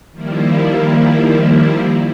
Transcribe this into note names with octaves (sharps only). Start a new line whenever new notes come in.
D#3 F3 G3 A#3 E4